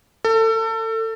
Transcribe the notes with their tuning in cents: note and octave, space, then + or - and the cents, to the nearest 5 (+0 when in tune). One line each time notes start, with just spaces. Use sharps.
A4 +30